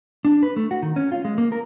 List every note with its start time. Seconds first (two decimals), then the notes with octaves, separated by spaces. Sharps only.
0.25 D4
0.43 B4
0.56 A3
0.71 F#4
0.83 D#3
0.96 C#4
1.12 F4
1.25 G#3
1.38 A#3
1.52 A#4